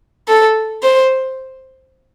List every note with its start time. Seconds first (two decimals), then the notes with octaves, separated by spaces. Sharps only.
0.28 A4
0.83 C5